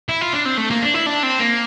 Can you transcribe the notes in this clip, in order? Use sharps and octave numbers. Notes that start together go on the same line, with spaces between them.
E4
F4
D4
C4
A3
A#3
D4
E4
D4
C4
A#3